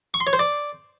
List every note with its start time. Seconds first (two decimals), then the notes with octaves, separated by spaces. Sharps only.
0.14 C#6
0.20 C6
0.27 C#5
0.33 C5
0.39 D5